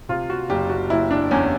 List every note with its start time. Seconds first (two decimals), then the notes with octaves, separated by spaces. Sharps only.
0.09 C3 F4
0.30 F#4
0.49 F#1 G4
0.70 F#4
0.90 F#1 E4
1.11 D4
1.31 E2 C#4